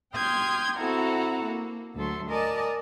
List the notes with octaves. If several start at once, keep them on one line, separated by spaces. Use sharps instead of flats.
G5 C6 D#6 F6 G6 G#6
C4 E4 F#4 A4 F#5 A#5
A#3
D2 F#3 A4 C6
A#4 D5 D#5 G#5 A5